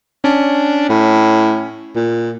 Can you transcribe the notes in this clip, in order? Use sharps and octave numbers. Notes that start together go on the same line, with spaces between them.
C#4 D4
A2
A#2